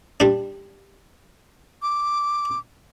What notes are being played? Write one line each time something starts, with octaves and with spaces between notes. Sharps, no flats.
G3 D4
D6